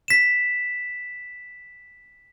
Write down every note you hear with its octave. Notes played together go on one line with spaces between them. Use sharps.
B6 E7